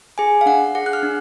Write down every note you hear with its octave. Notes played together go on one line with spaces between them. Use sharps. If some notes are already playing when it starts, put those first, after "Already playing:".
G#4 G#5
F5
D4 F#5
G#4 F#5
F#6
F6
D4